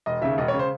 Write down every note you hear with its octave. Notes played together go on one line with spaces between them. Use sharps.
E1 D#5
D#2 C#3 E5
E1 D#5
C#5
C#3
C5